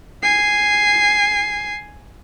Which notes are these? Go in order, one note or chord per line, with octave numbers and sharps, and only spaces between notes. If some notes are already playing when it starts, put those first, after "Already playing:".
G#5 C7